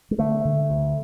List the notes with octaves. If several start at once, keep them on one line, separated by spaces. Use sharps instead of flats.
G#3
D3 A3
D3
D2